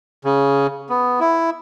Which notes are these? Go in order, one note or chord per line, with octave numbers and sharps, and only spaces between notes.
C#3
B3
E4